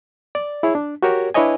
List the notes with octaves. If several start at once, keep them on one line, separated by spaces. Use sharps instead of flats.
D5
E4 G#4 C#5
D4
F#4 G4 A#4 C#5
D4 E4 B4 C#5 D#5 G#5